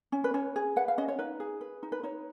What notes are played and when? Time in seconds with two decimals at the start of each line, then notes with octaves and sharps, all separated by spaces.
0.12 C#4
0.24 B4
0.34 C#4 C#5
0.56 G#4
0.76 B4 F#5
0.88 F5
0.98 C#4 D#5
1.08 C#5
1.19 D#4 B4
1.40 G#4
1.61 B4
1.83 D#4
1.92 B4
2.03 D#4 C#5